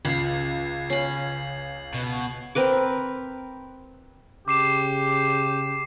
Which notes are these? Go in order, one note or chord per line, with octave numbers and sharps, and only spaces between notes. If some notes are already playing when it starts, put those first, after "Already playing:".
C#2 F4 B5 G#6 C7
C#4 B5 C7 F#7
B2
C4 A#4 B4 D6
C#3 G4 D6 C7 E7